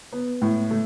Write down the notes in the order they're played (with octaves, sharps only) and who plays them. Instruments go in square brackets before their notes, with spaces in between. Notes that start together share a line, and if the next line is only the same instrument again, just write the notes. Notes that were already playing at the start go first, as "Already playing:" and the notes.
[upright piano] B3
A2
A3